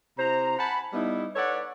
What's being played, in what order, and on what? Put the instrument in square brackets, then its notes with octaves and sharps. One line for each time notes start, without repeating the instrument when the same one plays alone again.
[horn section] C3 E4 C5 A#5
F#5 G#5 A5 B5
G3 B3 D#4 E4
A4 B4 C#5 D5 F#5